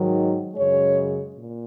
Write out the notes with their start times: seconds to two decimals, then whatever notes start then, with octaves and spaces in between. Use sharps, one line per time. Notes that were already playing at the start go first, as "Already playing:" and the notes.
Already playing: G#2 D#3 F#3
0.54 F#2 C#3 G#3 C#5
1.36 A#2